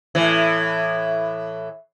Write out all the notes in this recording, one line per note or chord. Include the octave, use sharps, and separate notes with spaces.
A2 E3